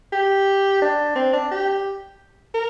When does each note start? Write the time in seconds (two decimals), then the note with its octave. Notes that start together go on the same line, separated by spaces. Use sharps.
0.12 G4
0.82 D4
1.16 C4
1.33 D4
1.51 G4
2.54 A#4